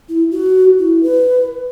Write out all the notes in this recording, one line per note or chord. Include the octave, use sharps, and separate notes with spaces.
E4
F#4
E4
B4